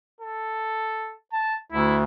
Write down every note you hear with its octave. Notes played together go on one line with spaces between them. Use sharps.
A4
A5
D2 E4